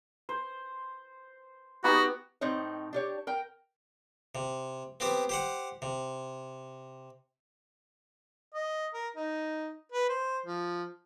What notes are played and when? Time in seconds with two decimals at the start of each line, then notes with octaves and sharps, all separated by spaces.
0.29 C5
1.84 B3 D#4 F#4 G4
2.41 A2 C4 D#4 C#5
2.93 D4 G4 C#5
3.27 A#4 G5
4.35 C3
5.00 B3 C4 G4 C5
5.29 G4 C5 F#5
5.82 C3
8.54 D#5
8.94 A#4
9.16 D#4
9.92 B4
10.09 C5
10.46 F3